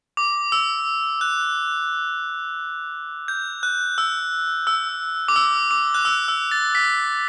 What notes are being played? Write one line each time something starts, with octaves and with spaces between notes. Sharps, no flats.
D6
E6
F#6
G6
F#6
E6
E6
D6
E6
D6
F#6
E6
E6
A6
B6